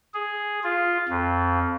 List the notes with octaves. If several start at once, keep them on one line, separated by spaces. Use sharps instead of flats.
G#4
F4
F2